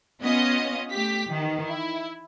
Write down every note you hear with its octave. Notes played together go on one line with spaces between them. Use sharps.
B3 C#4 F4 D#5
A3 G4 B6
D#3 E3
E4